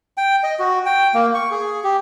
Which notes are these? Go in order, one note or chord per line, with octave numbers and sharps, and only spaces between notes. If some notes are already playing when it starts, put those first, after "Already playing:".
G5
D#5
F#4
G5
A#3
C#6
G#4
G4